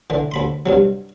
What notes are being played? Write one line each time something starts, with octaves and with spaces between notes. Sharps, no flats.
D3 E3
D2 B5 C6
G2 C3 F#3